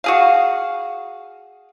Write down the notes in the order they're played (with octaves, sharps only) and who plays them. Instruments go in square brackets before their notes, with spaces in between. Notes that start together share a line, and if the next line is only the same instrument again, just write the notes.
[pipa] F#4 G#4 F5